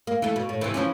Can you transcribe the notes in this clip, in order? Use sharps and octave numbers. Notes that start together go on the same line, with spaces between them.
A#3
E3 A3
B2
A2
C3 E3
E3 F3 C#4